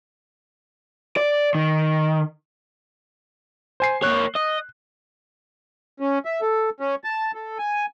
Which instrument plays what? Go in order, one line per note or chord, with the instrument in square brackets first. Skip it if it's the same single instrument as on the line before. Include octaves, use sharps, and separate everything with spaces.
[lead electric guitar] D5
D#3
[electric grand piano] C5 G#5 C7
[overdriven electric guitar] A#3 C#5 [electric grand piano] F#6
[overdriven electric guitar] D#5
[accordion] C#4
E5
A4
C#4
A5
A4
G#5